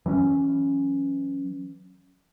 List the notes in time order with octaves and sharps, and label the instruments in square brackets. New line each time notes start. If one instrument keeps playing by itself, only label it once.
[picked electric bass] E3 F#3 C4 C#4